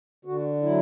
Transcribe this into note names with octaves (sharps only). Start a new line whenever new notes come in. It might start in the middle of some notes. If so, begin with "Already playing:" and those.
D3 F#4
F#3 E4